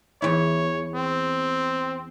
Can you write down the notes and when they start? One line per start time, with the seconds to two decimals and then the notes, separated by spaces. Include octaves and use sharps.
0.22 E2 E4 C#5
0.94 C4